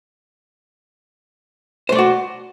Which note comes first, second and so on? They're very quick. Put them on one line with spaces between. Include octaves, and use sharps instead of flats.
C5 A3 D5 F#4